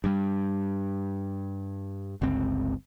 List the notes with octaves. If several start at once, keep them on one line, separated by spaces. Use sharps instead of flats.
G2 G3
G1 C#2 C4